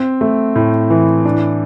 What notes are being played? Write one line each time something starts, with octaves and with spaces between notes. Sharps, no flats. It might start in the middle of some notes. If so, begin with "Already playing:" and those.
Already playing: C4
A3
A2
E3
D4